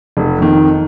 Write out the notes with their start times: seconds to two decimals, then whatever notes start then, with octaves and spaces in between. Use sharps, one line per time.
0.17 F1
0.38 F2 D#3